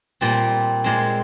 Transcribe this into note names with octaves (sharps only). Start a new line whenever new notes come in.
A#2 G3 C4
A#2 G#3 C4